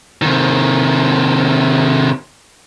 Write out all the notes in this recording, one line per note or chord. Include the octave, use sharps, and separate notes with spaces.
C3 D#3